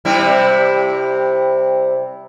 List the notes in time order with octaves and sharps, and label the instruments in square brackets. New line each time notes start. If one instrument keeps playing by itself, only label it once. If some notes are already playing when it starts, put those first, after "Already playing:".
[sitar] C3 G3 E4